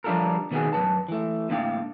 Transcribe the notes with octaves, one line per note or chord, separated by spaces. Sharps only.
F3 G3 D4 F4 A4 A#4
B2 D#3 B3 D#4 F#4 G#4
F#2 F#3 B4 A5
E3 A3
A2 A#3 D4 E4 F5 G5